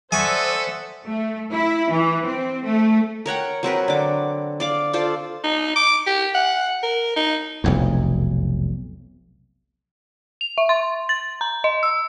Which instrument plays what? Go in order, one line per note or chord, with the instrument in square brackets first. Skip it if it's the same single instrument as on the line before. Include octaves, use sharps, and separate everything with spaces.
[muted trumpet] A4 [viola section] C5 D5 [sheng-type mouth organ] E5 F#5 D#6 [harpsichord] G#5 C#6
[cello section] A3
E4
E3
C4
A3
[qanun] A#4 C#5 F#5 G5
F#3 C4 A#4 B4
D3 D6
D5 F5 D6
F4 A4 C5 D5
[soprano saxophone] D#4
D6
G4
F#5
A#4
D#4
[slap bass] F1 B1 E2
[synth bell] F7
E5
C6
A6
A#5
D#5
E6